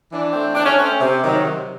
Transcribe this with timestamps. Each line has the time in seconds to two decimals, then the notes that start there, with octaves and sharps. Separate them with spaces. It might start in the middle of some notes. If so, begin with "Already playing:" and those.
0.11 E3 D4
0.33 A3 C4
0.55 E3 D4
0.65 C#4
0.78 A3 C4
0.84 C#4
1.00 C3
1.22 D#3 F#3
1.44 C3